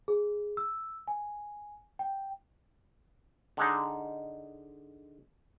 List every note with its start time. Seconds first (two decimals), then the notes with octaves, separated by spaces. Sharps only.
0.08 G#4
0.57 E6
1.08 G#5
1.99 G5
3.57 D3 G#3 D#4